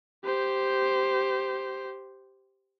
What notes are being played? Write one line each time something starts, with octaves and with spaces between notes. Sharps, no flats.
G4 C5